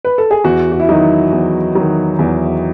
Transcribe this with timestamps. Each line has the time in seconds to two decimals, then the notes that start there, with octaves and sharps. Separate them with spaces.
0.05 B4
0.18 A4
0.31 G#4
0.44 E2 F#4
0.72 F#4
0.80 E4
0.89 D#3 F#3 D#4
1.32 E2
1.75 D#3 F#3
2.19 E2